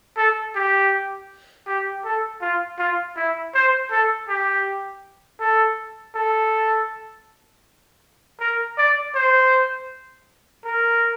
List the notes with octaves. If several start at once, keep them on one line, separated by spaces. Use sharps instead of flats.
A4
G4
G4
A4
F4
F4
E4
C5
A4
G4
A4
A4
A#4
D5
C5
A#4